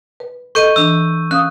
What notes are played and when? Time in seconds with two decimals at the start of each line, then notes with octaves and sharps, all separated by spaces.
0.20 B4
0.55 A4 B4 D#5 C#6 G6 D#7
0.76 E3 D4 E6
1.31 C#4 F5 D#6 F#6